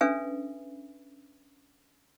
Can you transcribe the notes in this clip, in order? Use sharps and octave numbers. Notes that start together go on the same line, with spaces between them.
C#4 D4 A4 B4 E5 G#5